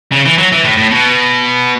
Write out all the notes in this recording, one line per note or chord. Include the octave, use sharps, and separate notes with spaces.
C#3
E3
F#3
E3
A2
A2
B2